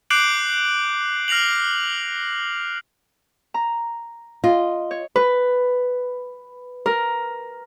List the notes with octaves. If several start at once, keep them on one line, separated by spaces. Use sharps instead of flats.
D6 F#6 G6 C7 D7 F#7
F6 A#6 C7 F7 F#7
A#5
F4 D#5
C#5
B4
A#4